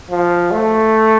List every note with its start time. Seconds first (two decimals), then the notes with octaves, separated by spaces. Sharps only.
0.10 F3
0.51 A3